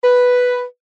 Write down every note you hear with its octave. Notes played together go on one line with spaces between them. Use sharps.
B4